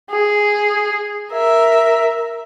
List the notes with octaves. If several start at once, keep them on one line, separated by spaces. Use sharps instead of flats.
G#4
A#4 E5